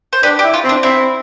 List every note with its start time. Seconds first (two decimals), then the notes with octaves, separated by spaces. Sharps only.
0.13 C5
0.23 D4 G4 B4
0.39 G4
0.44 E4
0.54 F4
0.64 C4
0.69 D4
0.83 C4 E4